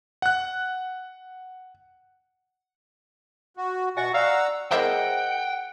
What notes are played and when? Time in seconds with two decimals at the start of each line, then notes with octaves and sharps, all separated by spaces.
0.22 F#5 F#6
3.57 F#4
3.97 B2 F#4 D#5 E5 F#5 G#5 C#6
4.14 D5 F5 F#5 A#5 C#6 E6
4.71 E3 G#4 A#4 C5 D#5 E5 F#5 G5